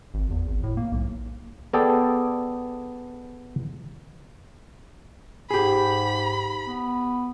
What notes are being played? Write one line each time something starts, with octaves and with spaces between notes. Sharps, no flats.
G#1
E2
G#1
A2
A#3
B1
B3 G#4 A4 D5 G5
G#2 G4 G#4 B5
B3